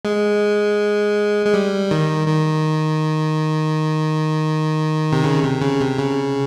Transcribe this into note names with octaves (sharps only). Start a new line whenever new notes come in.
G#3
G#3
G3
D#3
D#3
C3
C#3
C3
C#3
C3
C#3